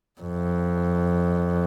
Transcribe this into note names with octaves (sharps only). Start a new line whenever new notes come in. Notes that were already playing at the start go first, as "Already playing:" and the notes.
F2